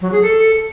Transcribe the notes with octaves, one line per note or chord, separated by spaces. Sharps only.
F#3
G#4
A4